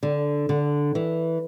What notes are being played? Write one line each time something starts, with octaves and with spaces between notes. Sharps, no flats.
D3
D3
E3